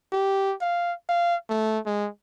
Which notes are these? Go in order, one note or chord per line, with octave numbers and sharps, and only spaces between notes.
G4
F5
F5
A3
G#3